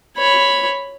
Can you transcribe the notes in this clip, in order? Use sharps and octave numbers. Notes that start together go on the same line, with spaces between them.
C#5 B5